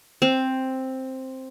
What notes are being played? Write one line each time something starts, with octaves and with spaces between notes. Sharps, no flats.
C4